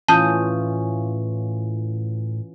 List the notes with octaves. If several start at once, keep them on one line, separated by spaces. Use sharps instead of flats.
A2 E3 C#4 F4 A5 D#6 G6 D#7